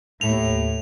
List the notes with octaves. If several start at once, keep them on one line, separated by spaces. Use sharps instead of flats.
D#2 A2 F7